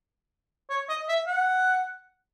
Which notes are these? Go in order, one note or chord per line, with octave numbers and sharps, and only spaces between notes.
C#5
D#5
E5
F#5